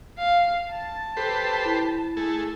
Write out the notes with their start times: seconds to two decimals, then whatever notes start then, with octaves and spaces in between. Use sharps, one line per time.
0.19 F5
0.72 A5 A6
1.17 G4 A4 B4 C5
1.65 E4
2.17 A3 G#4 A4